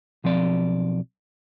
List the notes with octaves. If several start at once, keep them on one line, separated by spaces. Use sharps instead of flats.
B1 F3 C4 D5